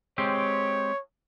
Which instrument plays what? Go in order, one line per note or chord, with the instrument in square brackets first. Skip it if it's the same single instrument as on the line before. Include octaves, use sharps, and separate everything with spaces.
[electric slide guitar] G#3 C4 G4 [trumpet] C#5